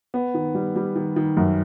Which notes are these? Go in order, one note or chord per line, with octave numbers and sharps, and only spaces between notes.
B3
D#3
G3
G3
D#3
D#3
F#2